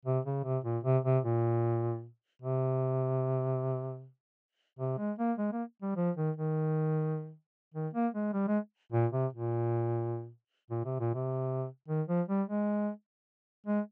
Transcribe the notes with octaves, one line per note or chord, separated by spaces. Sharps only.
C3
C#3
C3
A#2
C3
C3
A#2
C3
C3
G#3
A#3
G#3
A#3
G3
F3
D#3
D#3
D#3
A#3
G#3
G3
G#3
A#2
C3
A#2
A#2
C3
A#2
C3
D#3
F3
G3
G#3
G#3